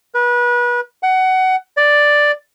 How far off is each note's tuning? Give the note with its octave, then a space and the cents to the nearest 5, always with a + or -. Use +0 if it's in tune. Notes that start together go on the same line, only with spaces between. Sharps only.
B4 -30
F#5 +20
D5 +5